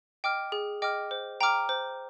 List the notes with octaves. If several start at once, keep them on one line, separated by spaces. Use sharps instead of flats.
D#5 G5 D6 F6
G#4
D#5 G5 D6 F6
C5
G5 A#5 D6 F6
C5